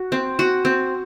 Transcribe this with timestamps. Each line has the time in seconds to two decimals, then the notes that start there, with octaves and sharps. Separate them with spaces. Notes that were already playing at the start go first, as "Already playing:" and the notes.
Already playing: F#4
0.12 C4
0.39 F#4
0.65 C4